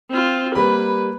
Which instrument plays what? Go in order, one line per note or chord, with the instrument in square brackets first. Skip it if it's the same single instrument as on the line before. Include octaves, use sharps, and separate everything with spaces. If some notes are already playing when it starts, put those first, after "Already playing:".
[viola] C4 F4
[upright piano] G3 A#3 B5 [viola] B4